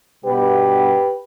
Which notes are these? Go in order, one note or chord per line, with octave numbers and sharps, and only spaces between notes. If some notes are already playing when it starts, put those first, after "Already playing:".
B2 G3 B3 D4 G4 B4